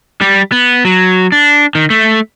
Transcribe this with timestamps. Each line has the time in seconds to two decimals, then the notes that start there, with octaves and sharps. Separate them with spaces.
0.21 G3
0.52 B3
0.85 F#3
1.32 D4
1.75 D#3
1.90 A3